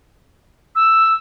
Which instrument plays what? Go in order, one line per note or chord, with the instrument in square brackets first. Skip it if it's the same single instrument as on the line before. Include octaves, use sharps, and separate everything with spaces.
[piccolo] E6